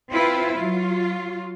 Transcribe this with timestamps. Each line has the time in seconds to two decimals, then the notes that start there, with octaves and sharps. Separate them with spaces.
0.12 C4 E4 F4 B4
0.57 F#3 F4